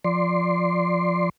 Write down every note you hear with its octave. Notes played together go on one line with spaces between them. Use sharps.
F3 D5 C6